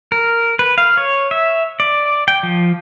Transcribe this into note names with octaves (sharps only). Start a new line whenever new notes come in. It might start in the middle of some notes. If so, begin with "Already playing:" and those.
A#4
B4
F5
C#5
E5
D5
G5
F3